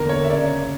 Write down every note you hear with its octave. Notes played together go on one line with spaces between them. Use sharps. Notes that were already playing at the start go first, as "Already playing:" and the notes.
Already playing: E2 D3 A#3 A#4
C#5
E5
C#3 D5